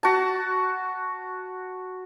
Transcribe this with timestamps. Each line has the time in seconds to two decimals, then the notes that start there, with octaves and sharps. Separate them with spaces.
0.03 F#4 A5